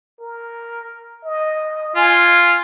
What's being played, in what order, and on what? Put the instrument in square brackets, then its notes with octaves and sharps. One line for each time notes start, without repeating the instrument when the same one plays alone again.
[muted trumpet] A#4
D#5
[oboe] F4 [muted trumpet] G#5